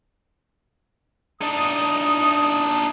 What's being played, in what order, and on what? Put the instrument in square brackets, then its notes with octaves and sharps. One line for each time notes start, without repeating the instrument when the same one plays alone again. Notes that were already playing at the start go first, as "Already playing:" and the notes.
[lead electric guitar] D4 D#4 [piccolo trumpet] D#6